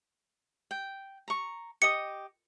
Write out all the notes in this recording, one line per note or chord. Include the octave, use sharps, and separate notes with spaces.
G5
A#5 C#6
G4 D#5 D#6 C#7